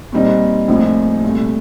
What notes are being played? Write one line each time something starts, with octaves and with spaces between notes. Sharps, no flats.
A#2 G3 C4 D#4
A#1 A2 F3 C4 D#4
C2 A#2 A3